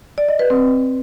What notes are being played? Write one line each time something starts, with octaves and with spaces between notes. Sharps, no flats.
D5
D#5
B4
C4